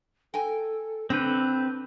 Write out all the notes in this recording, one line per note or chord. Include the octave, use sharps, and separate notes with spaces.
A4 G5 G#5
D3 C4 B4 G6